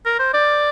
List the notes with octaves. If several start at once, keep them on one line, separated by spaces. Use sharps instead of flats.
A#4
C5
D5